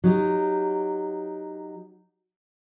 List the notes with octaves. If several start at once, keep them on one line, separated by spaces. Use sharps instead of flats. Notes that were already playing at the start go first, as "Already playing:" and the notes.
F#3 D#4 G4